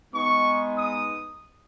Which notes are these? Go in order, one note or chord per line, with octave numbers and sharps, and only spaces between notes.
G#3 B3 D#4 C#6
D#6